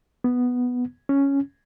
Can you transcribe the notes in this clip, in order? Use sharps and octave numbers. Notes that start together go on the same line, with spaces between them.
B3
C#4